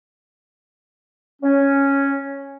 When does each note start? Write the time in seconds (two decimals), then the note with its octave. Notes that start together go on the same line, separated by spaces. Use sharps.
1.42 C#4